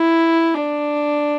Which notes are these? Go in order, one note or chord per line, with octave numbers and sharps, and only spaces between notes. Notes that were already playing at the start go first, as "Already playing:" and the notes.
Already playing: E4
D4